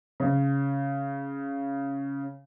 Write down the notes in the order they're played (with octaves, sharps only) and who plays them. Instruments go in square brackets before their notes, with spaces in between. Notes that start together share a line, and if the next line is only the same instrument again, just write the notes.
[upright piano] C#3